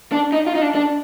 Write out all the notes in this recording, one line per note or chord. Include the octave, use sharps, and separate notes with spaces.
D4
D#4
F4
D#4
D4
D4